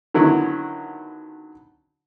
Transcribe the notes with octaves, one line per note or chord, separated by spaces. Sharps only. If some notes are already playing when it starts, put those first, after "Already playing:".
D3 D#3 F#3 B3 C#4 E4